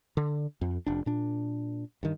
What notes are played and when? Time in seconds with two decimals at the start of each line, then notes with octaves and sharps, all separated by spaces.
0.17 D3
0.61 F2
0.86 F1 D4
1.06 A#2 D4
2.03 G2 D#3